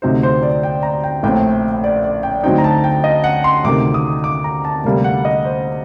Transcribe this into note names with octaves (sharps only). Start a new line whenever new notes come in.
D2 C3 F#3 C4 D#4 C5
C5
D5
G5
A#5
G5
A#1 A2 A3 C4 G5
D5
D5
G5
D2 D3 F#3 C4 D#4 G5
A#5
A5
G5
D#5
F#5
C6
D2 C3 D#3 D6
D#6
D6
A#5
A5
D2 C3 G3 A#3
F#5
D#5
C5